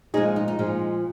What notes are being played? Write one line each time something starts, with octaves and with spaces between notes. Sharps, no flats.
A#2 F3 G#3 D#4 G#4
D#4
D#4
A#2 F3 G#3